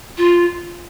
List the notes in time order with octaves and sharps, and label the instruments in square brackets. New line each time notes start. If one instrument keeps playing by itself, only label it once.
[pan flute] F4